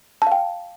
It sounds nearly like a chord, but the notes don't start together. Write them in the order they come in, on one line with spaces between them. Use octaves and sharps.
A5 F5 G5